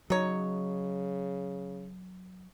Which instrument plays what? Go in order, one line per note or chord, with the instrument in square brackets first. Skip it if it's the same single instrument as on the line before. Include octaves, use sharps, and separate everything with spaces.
[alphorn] C#3 [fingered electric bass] F#3 [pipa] D#4 C#5